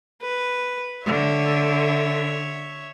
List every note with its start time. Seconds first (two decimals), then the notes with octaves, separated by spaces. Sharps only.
0.21 B4
1.06 D3 C#5 E5